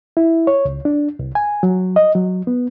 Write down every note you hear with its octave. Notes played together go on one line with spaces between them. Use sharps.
E4
C#5
C#2
D4
C2
G#5
F#3
D#5
F#3
B3